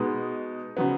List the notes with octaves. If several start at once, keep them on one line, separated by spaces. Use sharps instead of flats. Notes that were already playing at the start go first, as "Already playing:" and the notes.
Already playing: B2 G#3 B3 D#4
C#3 F#3 B3